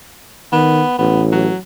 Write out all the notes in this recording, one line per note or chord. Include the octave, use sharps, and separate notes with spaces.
D#3 B3
A1 B3
F#3